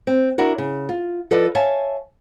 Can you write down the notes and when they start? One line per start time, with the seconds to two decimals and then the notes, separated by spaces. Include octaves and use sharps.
0.07 C4
0.38 D4 E4 F#4 A#4
0.58 C#3
0.89 F4
1.31 F3 A4 B4 D5 D#5
1.55 C#5 E5 F5 G#5 A5